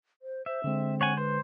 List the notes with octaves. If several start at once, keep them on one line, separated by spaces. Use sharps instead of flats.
C5
C5 E5
D3 G#3 C4
C#5 F#5 G#5
B4 C5